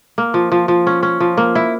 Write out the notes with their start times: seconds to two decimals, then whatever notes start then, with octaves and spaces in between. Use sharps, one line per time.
0.18 A#3
0.34 F3
0.52 F3
0.68 F3
0.87 C#4
1.03 C#4
1.20 F3
1.37 A#3
1.55 E4